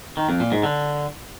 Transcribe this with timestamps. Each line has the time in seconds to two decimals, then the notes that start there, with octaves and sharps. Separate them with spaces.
0.17 D#3
0.29 F2
0.40 A#2
0.52 G#2
0.63 D3